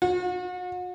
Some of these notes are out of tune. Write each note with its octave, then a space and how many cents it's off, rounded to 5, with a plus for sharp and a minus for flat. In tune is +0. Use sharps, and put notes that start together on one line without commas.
F#4 -40